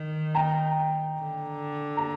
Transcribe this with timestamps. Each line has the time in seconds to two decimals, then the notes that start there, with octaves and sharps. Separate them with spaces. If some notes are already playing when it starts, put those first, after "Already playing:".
Already playing: D#3
0.35 G5 A#5
1.21 D3
1.97 A#5